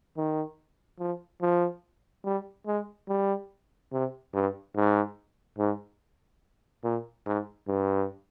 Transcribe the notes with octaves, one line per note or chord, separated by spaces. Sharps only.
D#3
F3
F3
G3
G#3
G3
C3
G2
G#2
G#2
A#2
G#2
G2